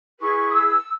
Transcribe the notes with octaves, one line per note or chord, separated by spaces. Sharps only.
E4 G#4 B4 C#6
D#6
E6